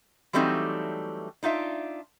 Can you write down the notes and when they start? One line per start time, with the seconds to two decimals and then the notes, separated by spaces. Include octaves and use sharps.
0.33 E3 F#3 G3 A3 C4 D#4
1.43 D4 D#4 F4 E5